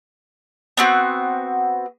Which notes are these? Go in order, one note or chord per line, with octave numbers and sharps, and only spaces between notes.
B3 C4 F#4